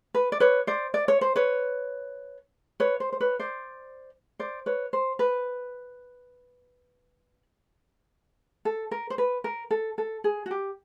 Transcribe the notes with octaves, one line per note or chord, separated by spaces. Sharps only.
B4
D5
B4 C#5
C5 D5
D5
C#5
C5
B4 C#5
B4 C#5
C5
C5
B4 C#5
C5 D5
C5 D5
B4 C#5
C5
B4
A4
A#4
C5
B4
A#4
A4
A4
G#4
F#4
G4